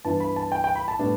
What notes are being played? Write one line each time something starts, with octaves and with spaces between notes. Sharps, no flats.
G2 E3 B3 D4 A5
B5
A5
G5
G5
B5
A5
A2 G3 B3 D4